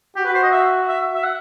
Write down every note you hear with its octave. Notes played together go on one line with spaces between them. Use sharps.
F#4 G4
B4
C5
D#5
E5
E5
E5
F#5